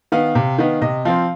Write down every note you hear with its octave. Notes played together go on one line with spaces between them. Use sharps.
D#3 B3 F5
C3
D#3 B3
C3 D#5
F3 C4 F5